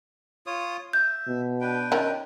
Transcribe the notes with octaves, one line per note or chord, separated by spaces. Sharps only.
F4 C#5 D#6
E5 G6
B2
D4 B4 G5
D#3 C#4 A#4